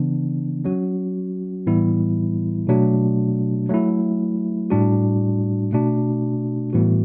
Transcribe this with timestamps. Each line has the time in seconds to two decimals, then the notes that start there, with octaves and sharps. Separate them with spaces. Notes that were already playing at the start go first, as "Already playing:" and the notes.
Already playing: C#3 E3 B3 D4
0.65 F#3 C#4 F#4
1.67 A2 E3 G3 B3 E4
2.67 B2 F#3 A3 D4 F#4
3.69 F#3 A3 E4
4.70 A2 G3 D4 F#4
5.72 B2 A3 D4 F#4
6.73 A2 E3 G3 B3 F#4